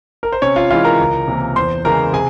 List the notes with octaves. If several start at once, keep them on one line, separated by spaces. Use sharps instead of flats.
A#4
C5
C3 C#4 C#5
F4 F5
E3 G#3 E4 F4 F5
A#4 A#5
C#2
C3 E3 A#3
E2 C5 C6
C#3 E3 G#3 C#4 A#4 A#5
C3 G#4 G#5